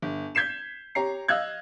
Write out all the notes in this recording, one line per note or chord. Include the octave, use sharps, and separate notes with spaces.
G1
G6 G#6 B6 C7 E7
G4 C#5 A#5 C7
D#5 F5 E6 F#6 G#6